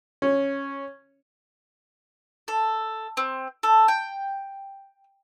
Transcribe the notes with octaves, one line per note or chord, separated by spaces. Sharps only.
C#4
A4
C4
A4
G5